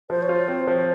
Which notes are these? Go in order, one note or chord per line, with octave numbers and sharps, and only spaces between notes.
F3 C5
C#5
F4
C5
C4 C#5
C5
F3 C#5